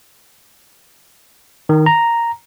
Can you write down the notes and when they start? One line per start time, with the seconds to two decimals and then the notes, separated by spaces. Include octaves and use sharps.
1.69 D#3
1.86 A#5